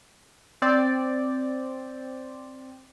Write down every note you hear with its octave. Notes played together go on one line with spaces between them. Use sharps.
C4 D5